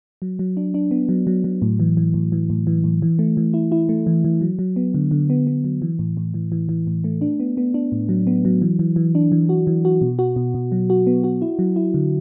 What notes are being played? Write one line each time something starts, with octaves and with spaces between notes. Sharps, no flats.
F#3
F#3
D4
D4
B3
F#3
F#3
F#3
A2
E3
E3
A2
E3
A2
E3
A2
E3
A3
E3
E4
E4
A3
E3
E3
F#3
F#3
B3
D3
D3
B3
B3
F#3
E3
A2
A2
E3
E3
E3
A2
A3
D4
B3
B3
D4
A2
F#3
B3
F#3
E3
E3
E3
D4
E3
F#4
E3
F#4
B2
F#4
B2
B2
F#3
F#4
B3
F#4
E4
F#3
E4
D3